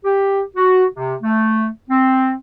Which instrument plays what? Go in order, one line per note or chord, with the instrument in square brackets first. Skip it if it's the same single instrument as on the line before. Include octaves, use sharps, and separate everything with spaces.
[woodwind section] G4
F#4
C3
A3
C4